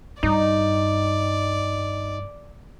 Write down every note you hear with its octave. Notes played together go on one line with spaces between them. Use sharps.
G2 D#4 D5